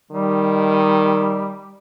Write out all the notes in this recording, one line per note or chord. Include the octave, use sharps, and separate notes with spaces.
D#3 G3